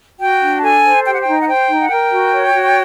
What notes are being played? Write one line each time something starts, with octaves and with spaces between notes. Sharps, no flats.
F#4 G5
D4
A5
A4 G#5
C5
G4 G5
F#5
D#4 G5
F#5
C5 G5
D#4
F#5
A#4 G5
F#4
C#5
F#4